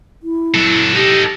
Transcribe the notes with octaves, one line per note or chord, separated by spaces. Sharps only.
E4
F#3 A4
D#4 G4 A4